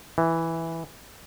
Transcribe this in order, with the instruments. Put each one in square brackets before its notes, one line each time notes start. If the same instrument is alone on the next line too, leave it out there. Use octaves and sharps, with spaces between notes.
[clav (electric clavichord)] E3